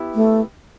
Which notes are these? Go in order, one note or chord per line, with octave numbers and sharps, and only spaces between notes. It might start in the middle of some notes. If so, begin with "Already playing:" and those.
Already playing: B3 E4 G4
A3